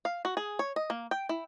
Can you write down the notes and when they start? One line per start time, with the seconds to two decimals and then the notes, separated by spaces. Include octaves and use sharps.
0.05 F5
0.25 F#4
0.37 G#4
0.59 C#5
0.76 D#5
0.90 A#3
1.11 G5
1.29 E4